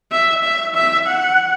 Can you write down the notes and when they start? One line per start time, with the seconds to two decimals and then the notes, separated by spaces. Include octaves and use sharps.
0.11 E5
0.44 E5
0.75 E5
1.06 F#5